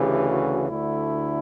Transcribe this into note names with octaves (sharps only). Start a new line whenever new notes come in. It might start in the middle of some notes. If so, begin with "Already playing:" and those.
Already playing: D2 C#3 E3 G4
F#4
D2 D3 A3 E4